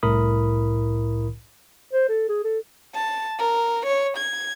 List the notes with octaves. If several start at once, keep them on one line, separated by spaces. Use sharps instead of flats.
C2 A2 E4 A#4 B5 D#6
C5
A4
G#4
A4
A5
A#4
C#5
G#6